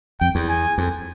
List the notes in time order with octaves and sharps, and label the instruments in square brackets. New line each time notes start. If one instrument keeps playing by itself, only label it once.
[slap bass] F2 [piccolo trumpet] G5
[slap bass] E2
[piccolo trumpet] G#5
[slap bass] F2